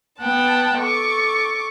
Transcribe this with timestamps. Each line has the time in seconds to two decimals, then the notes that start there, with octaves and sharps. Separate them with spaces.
0.21 B3 F#5 G5 A5
0.79 A4 C#6 D6